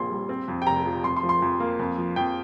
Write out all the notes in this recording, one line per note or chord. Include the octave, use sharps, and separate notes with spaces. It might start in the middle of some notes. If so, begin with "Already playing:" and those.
Already playing: A#1 A#2 C4 C6
G3
C4
F2
G5
F1 A#5
F3
F2 C6
C6
F3
C6
F2
A#3
F2
F3
F2 G5